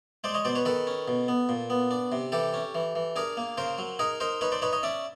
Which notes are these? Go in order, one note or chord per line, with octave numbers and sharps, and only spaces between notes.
G#3 C5 D5
C#5 D#5
B2 C5 D5
B4 C#5
D#3 A4 B4
C#4
B2
B3
A#2
B3
D4
C3
E3 G4 A4
C#4
E3
E3
D4 G#4 A#4
A#3
C#3 A#4 C5
F#3
D#4 G#4 A#4
D#4 A#4 C5
D#4 B4 C#5
C5 D5
D#4 B4 C#5
C#5 D#5
C#4 D5 E5